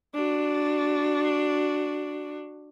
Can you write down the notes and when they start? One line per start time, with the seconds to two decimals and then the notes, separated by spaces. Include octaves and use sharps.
0.14 D4 F#4